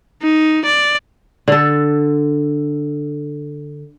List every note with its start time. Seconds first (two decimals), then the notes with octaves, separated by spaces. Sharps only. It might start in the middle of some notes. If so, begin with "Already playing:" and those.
0.23 D#4
0.65 D5
1.48 D3 A4